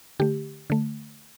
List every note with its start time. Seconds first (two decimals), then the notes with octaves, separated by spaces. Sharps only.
0.20 D3 A3 G4
0.70 D3 A3